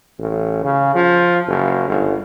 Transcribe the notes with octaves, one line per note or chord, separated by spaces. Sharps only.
A1
C#3
F3
F#1
G1